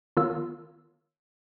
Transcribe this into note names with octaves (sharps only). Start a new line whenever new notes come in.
D#3 B3 F4 C#5 F5 E6